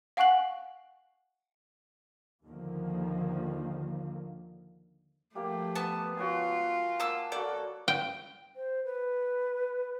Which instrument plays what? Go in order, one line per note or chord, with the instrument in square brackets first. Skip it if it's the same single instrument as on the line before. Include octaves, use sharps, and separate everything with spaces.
[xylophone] F5 F#5 G#5 C#6 F#6 F#7
[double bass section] D#2 D3 D#3 F3 A#3
[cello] F3 A3 [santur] G3 A#3 G4
[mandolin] B3 A5
[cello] F4 [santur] F#4 C#5 G#5
[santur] A#3 [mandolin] A5 E6
[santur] A#3 F#4 [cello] A4 [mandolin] D5
[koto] G5
[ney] C5
B4